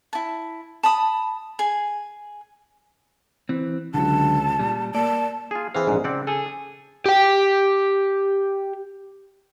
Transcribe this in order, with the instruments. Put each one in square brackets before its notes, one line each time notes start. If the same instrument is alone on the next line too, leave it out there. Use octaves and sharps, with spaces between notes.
[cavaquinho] E4 A5
A5 B5 D#6
G#4 G#5
[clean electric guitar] E3 C4
[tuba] C#2 [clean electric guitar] D3 F#3 [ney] A5
[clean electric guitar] A#2 G3
[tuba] A#3 [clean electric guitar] D5 [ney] A5
[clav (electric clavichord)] F4 G#4
[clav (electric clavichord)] E3 F5 [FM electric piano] C4 G#4
[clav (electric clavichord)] A#1 G#2
[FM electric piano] C#3 [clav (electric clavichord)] C4 D5 F#5
[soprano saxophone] G#4 [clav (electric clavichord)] A4
[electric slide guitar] G4 G5